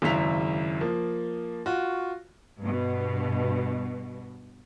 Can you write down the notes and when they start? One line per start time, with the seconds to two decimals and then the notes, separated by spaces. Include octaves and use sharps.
0.02 G#1 F#2 C#3 E4 B6 F7
0.81 F3 A#3
1.66 F4 F#4
2.60 G2 B2